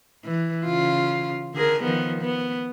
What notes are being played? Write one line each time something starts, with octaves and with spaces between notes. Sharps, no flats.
E3
C#3 F4
D3 G#4 A#4
D#3 F3 B3
B3